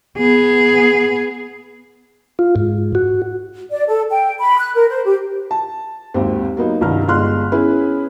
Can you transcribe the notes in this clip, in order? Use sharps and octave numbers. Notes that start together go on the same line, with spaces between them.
B3 G#4
F4
G#2
F#4
D5
A4
G5
B5
F#6
A#4
C5
G4
A5
G#1 D#2 C4 G4
F#3 A#3 B3 D#4
C2 G2 D#3 F6
G1 G#3 C6 F6 F#6
B3 C#4 E4 G#4 B4